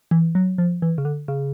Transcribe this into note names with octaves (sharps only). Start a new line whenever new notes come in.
E3
F#3
F3
E3
C#3
D3
C#3